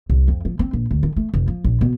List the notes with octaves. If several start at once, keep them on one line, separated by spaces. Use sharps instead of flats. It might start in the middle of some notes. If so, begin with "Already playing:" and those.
C2
F2
F3
C4
A#1
D2
D#3
A3
F1
F3
A#1
B2